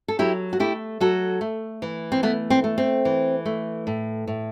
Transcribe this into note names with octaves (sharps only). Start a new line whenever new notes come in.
A4
F#3 E4 G4
F#4
A3 E4 G4
F#3 F#4 A4
A3
E3
C4
A3 B3
C4
A3
C4
E3
A3
A2
A2